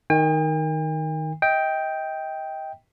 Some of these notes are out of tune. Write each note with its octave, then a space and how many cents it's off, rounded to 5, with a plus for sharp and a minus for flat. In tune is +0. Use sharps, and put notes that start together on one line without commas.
D#3 +0 G5 +45
D#5 +30 G5 +0